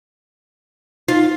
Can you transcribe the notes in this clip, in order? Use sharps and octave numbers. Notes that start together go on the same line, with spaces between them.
D#4 F4